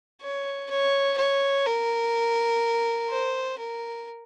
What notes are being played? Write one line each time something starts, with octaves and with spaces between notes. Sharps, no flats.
C#5
C#5
C#5
A#4
C5
A#4